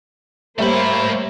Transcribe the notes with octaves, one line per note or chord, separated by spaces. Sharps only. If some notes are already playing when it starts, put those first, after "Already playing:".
G3 A3 A#3 C5 C#5 E5 B5